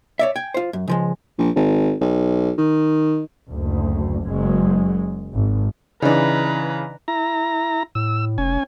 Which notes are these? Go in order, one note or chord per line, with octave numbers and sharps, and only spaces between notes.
C#5 D5 E5
G5 G#5
F4 C5
F#2
C#2 F3 G#3
A#1
G#1
B1
D#3
F#1 D2
F#1 F#2 F#3 G#3
G#1
C#3 E3 D4 D#4 B4 A#5
E4 A#5
A2 E6
F1 C#4 G#5